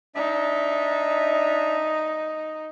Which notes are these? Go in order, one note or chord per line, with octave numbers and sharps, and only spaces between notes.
D4 D#4 E5